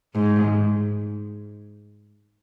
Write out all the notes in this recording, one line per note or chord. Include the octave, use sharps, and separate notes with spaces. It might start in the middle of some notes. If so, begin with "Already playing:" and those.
G#2